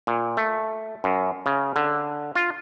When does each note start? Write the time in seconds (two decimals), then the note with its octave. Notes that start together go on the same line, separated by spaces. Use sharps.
0.07 A#2
0.37 A3
1.04 F#2
1.46 C#3
1.76 D3
2.35 F4